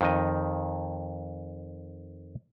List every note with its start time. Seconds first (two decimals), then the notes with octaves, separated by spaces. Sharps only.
0.01 F2 D#3 D#5